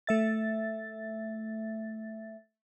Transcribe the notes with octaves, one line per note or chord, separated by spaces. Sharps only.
A3 E5 A6